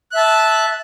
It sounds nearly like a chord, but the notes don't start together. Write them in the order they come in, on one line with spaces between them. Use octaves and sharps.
F#6 E5 A5